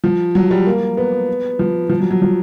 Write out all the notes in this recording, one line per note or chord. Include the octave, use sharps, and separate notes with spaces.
F3
F#3
G3
A#3
B3
F3
F3
F#3
F#3
F3